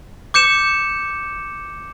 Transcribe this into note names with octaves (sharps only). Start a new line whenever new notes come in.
D6 G6 C#7 E7